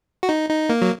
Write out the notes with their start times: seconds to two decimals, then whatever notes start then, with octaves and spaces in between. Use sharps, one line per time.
0.23 F#4
0.29 D#4
0.50 D#4
0.70 A#3
0.82 F#3